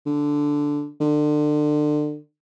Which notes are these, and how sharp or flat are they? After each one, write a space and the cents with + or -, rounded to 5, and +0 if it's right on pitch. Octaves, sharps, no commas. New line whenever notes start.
D3 -5
D3 +30